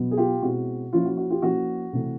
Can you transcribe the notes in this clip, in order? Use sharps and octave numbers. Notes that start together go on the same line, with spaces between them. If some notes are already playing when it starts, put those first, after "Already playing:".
Already playing: B2 F#3 B3
G#4
F4 G4
B2 G#3 C4 E4 F#4
F3 A#3 C#4 E4 F4
F#4
F#4
F4 G4
F3 A#3 C#4 E4 F#4
C3 E3 A3